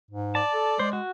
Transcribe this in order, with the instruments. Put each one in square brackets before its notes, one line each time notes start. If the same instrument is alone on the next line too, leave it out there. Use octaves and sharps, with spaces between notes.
[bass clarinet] G#2
[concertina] D5 [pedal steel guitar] A5
[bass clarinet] A4
[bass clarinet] G#3 [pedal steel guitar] C5
[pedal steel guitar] F#4